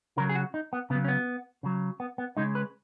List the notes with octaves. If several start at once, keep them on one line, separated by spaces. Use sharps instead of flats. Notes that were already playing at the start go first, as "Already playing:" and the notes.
C#3 F#3 A#4
G#4
F#4
D#4
B3
C#3 F#3 B3
C#4
B3
C#3 F#3
B3
B3
C#3 G#3 D#4
B4